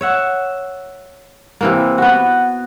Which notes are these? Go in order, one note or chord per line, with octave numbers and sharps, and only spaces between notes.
C#5 E5 F#5
C3 E3 A#3
B3 F#4